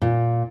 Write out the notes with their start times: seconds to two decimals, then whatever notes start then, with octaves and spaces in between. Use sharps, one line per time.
0.02 A#2